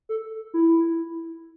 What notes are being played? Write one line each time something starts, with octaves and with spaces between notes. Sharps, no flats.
A4
E4